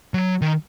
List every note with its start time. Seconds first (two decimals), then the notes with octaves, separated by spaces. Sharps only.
0.14 F#3
0.42 D#3